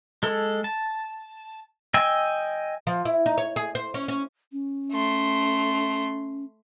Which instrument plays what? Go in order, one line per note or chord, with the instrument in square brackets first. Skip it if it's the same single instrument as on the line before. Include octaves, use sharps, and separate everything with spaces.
[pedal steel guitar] G#3 A4
A5
D#5 G5 G#5 E6
[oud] F3
E4
D#4
C#5
G#4
C5
C#4
C#4
[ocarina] C#4
[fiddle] A3 C6